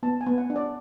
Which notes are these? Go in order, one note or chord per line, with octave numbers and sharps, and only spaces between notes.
B3 A5
G#5
B3
F#5
D4
D5